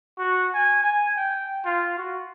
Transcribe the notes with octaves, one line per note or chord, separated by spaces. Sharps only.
F#4
G#5
G#5
G5
F4
F#4